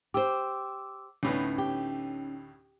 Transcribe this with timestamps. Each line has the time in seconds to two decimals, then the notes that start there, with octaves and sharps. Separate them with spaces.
0.14 G4 C5 D6 E6
1.23 D2 A2 B3 C#4 D#4
1.58 G4